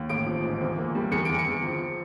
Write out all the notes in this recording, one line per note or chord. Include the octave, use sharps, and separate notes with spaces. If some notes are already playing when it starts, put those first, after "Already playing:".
Already playing: D#2
A1 D7
F3
G#2
E2
A#3
G3
E2 C#7
E2 D7
C#7
E2
F3